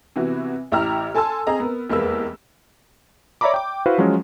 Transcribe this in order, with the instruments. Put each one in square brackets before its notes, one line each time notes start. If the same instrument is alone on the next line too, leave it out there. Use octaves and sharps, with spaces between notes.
[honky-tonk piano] C3 E3 B3 F#4
A1 E4 G4 A#5 E6 F6
A4 G#5 A5 C6 E6
C4 G#4 D#5 A#5
B3 A#4
F1 E2 G#3 A#3 B4 E6
[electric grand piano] C#5 D5 E5 A#5 B5 D6
G5 D6
E4 F#4 B4 C5 F5
F3 F#3 G#3 C#4 F4